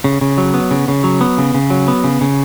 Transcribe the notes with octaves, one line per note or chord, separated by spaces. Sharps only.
C#3
C#3
F#3
B3
C#3
C#3
F#3
B3
C#3
C#3
F#3
B3
C#3
C#3